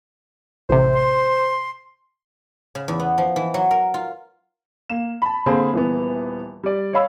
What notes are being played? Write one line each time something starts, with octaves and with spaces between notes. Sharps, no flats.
A1 C3 C5
C6
C#3
E2
B3
F3
E3
F#3
A#4
F4
A#3 E7
A5 B5
D3 A#3 C4 G#4 B5
D#1 E3 B3
G3 D5
C#5 D#5 F5 B5 E6